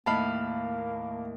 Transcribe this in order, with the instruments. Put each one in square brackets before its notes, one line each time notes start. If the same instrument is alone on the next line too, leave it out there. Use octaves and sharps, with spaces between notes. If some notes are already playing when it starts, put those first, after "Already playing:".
[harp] D#2 A2 F5 [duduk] A#3 [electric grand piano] A5 B5